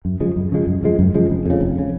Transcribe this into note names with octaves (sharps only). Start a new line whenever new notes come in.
F#2
C#3 F3 G#3
F#2
C#3 F3 G#3
F#2
C#3 F3 G#3
F#2
C#3 F3 G#3
F1
F2 C#3
F1
C#3